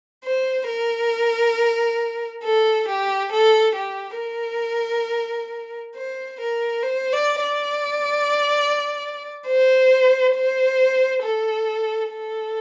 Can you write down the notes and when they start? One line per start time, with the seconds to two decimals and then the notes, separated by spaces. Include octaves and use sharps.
0.25 C5
0.68 A#4
2.44 A4
2.88 G4
3.32 A4
3.76 G4
4.19 A#4
5.96 C5
6.40 A#4
6.83 C5
7.13 D5
7.42 D5
9.48 C5
10.35 C5
11.23 A4
12.12 A4